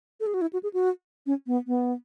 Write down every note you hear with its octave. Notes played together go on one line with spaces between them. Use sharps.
A4
G#4
F#4
E4
F#4
G#4
F#4
C#4
B3
B3